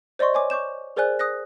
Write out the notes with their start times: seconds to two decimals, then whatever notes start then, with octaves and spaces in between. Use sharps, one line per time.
0.19 C5 D5 D#5 C6 C#6
0.34 C#5 G#5 D6
0.50 C#6 D6 G6 E7
0.96 G#4 A#4 C5 D5 G#5 F#6
1.19 D#6 F#6 A#6